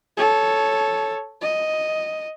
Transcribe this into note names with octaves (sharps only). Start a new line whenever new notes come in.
A4 C#5
D#5